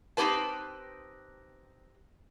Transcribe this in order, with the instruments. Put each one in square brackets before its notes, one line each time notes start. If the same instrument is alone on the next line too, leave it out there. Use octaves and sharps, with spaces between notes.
[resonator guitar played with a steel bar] C4 D#4 E4 G4 B4 A5